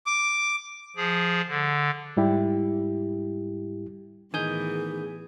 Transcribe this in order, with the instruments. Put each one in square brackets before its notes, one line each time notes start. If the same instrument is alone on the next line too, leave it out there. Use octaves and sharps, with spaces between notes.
[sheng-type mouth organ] D6
[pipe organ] F3 G#4
D3
[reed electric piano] G#2 G3 E4 G4
[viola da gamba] A2 E3 B3 [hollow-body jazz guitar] D#3 [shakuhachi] G#4 [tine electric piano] G#5 D#6 G6